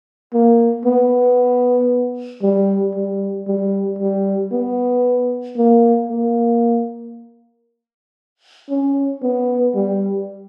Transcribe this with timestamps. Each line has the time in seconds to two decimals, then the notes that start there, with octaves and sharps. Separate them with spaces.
0.34 A#3
0.86 B3
2.43 G3
2.95 G3
3.47 G3
3.99 G3
4.52 B3
5.57 A#3
6.09 A#3
8.69 C#4
9.23 B3
9.75 G3